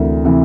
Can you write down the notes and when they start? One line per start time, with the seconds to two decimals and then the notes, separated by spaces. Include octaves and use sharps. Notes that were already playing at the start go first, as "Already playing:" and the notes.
Already playing: D2 C3 E3 A#4
0.24 C3 E3